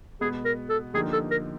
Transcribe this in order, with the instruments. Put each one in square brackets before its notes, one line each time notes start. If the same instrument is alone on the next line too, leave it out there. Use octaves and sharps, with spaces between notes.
[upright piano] B2 G#3 B3 [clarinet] G#4
[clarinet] A#4
A4
[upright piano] D3 F3 A#3 D#4 G4 [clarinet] G#4
[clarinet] A4
A#4